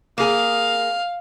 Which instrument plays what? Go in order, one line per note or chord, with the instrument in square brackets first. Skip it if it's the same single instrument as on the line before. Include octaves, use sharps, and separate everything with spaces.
[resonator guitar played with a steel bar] A#3 G#4 [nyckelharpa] F5